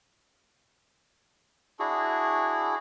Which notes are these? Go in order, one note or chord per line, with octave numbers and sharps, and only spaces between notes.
D4 E4 F#4 G#4